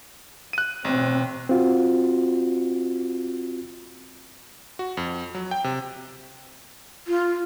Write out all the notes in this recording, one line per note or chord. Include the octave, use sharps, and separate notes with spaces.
F#6 D#7
A1 B2 C4
C4 F4 F#4
F#4
F2
F#3
G5
C3
F4